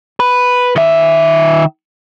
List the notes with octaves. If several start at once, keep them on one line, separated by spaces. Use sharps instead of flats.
B4
D#3 E5